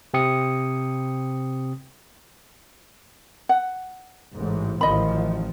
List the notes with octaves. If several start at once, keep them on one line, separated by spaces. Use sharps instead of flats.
C3 C4 G5 D#6 C#7
F#5
A1 G#2
A1 D#3 F3 D#5 B5